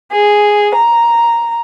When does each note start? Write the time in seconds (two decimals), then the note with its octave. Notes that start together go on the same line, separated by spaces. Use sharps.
0.12 G#4
0.76 A#5